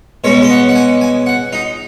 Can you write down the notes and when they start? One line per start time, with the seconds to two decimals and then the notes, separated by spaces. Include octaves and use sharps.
0.24 B2 G#3 C#4 C#5
0.43 D#5
0.51 F#5
0.69 F#5
0.76 G#5
1.01 G#5
1.27 F#5
1.53 D#4